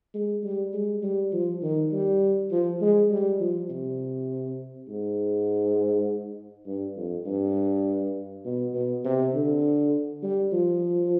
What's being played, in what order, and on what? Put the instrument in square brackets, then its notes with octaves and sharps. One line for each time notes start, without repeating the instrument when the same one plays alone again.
[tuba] G#3
G3
G#3
G3
F3
D#3
G3
F3
G#3
G3
F3
C3
G#2
G2
F2
G2
B2
B2
C3
D3
G3
F3